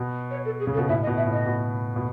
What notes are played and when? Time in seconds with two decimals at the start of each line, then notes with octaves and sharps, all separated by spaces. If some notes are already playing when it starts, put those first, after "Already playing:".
Already playing: B2
0.31 C#5
0.45 A4
0.60 G#4
0.67 C#3
0.74 A4
0.78 B2
0.89 A2 E5
1.03 D#5
1.07 B2
1.17 E5
1.27 A2
1.32 D#5
1.46 B2
1.96 B2